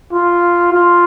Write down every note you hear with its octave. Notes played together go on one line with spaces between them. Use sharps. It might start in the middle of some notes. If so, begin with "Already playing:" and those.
F4
F4